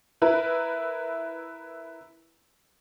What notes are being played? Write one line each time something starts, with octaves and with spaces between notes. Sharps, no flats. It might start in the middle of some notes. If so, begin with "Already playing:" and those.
E4 A#4 B4